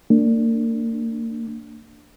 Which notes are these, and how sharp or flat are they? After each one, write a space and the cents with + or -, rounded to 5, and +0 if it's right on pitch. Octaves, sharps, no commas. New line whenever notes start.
A#3 -35 D4 +0